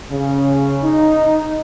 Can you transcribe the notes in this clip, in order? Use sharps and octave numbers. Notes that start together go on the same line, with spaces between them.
C#3
D#4